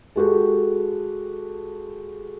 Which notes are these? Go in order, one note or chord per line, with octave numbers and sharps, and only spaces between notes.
G#3 F#4 G4 A4